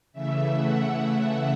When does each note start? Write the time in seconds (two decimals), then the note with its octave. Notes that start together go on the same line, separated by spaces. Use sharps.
0.13 C#3 E3 A3 E5
0.53 F#5
0.93 E5